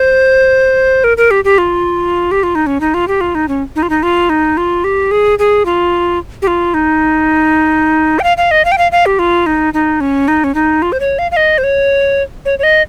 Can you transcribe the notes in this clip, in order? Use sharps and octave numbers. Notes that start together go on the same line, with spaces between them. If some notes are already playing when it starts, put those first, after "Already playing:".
Already playing: C5
A#4
A#4
G4
G4
F4
G4
F4
D#4
C#4
D#4
F4
G4
F4
D#4
C#4
D#4
F4
D#4
F4
D#4
F4
G4
G#4
G#4
F4
G4
F4
D#4
G5
F5
F5
D#5
F5
G5
F5
F5
G4
F4
D#4
D#4
C#4
D#4
C#4
D#4
F4
C5
C#5
F5
F5
D#5
C5
C#5
C#5
C#5
D#5